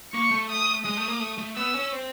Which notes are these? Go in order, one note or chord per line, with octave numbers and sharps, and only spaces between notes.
A#3 C#6
A3
D#6
G#3 D#6
A3
A#3
A3
A3
B3 E6
C#4
C4